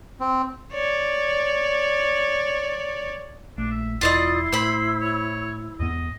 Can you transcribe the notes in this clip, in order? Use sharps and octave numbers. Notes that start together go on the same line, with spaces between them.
C4
C#5 D5
A#1 A3 D4
E5
E1 E4 F4 D5 D#5 C6
A2 C5 B5
C#5
E2 G#2 B3 D#5